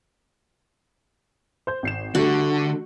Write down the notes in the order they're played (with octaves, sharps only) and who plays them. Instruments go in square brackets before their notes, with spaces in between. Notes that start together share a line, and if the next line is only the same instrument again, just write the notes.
[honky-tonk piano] C5 G6
G#1 C7 E7
[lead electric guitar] D3 [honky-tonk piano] G3 A3 [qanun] F#4